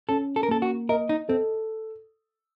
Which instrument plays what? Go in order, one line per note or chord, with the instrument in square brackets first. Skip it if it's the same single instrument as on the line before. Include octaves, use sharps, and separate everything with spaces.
[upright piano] C#4 [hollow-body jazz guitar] A4
[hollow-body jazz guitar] A4
A#4
[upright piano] A#3 [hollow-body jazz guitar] A4
[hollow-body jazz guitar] F#4
[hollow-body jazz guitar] A#4 [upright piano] D#5
[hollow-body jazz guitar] D#4
[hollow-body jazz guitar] C4 [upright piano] A4